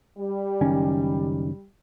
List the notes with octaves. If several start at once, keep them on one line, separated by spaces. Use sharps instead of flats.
G3
F#1 D#3 C#4